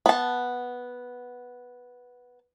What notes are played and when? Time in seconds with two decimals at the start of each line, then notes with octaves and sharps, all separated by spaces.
0.06 B3 A5